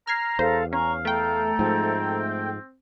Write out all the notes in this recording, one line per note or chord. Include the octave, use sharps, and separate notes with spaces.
A#5 F6 G#6 C7
E2 A4 C5 F5
C#4 F5 A#5 C#6
A3 A4 G5 A#5
G#2 F3 C4